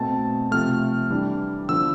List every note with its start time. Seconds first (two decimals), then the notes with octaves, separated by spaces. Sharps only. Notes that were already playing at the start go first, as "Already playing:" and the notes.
Already playing: B2 A3 C4 A5
0.51 C3 F3 A3 F6
1.10 E3 G3 D4
1.69 D3 F3 B3 E6